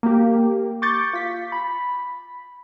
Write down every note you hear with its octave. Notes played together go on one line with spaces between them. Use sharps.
A#3 G4
C#6 D6 G6 A6 C#7
F4 B6
B5